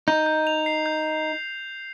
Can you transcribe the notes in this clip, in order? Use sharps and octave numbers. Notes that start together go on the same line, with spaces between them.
D#4 G6
G6
F7
C7
G6